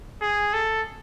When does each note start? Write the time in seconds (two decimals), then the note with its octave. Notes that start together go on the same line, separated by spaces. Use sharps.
0.22 G#4
0.53 A4